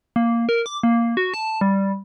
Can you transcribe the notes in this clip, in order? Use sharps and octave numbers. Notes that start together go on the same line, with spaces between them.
A#3
A#4
D6
A#3
F#4
A5
G3